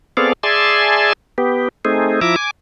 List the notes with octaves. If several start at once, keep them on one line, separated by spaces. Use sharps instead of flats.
B3 C4 G#4 A4 D5 F5
G#4 D5 E5 G#5 A5 C6
B3 G4
A3 C4 D#4 G#4
F3 E4 E5 A#5 D6
G#5 D6